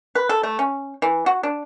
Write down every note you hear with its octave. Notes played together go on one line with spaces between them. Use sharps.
B4
A4
A3
C#4
E3
F#4
D4